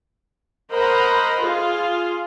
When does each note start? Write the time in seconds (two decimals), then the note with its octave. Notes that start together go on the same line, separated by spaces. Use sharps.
0.73 A#4 C5 D#5 F#5 B5
1.42 F4 G#4